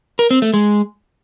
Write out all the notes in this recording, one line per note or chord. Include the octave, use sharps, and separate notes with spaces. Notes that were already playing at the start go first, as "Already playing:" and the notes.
A#4
C4
A3
G#3